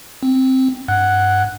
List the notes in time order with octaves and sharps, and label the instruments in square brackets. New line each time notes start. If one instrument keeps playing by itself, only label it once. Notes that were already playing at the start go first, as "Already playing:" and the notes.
[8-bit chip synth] C4
G2 F#5 F#6